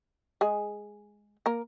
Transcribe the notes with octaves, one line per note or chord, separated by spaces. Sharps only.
G#3 G#4
A#3 A#4